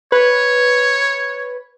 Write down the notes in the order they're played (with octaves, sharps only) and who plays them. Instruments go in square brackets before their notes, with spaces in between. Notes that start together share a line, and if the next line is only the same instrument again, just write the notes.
[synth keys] B4 [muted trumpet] C#5